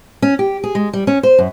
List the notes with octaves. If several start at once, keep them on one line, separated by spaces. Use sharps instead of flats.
C#4
G4
G#4
G#3
G3
C#4
C5
F#2